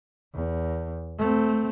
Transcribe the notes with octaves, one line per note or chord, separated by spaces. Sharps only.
E2
A3 C4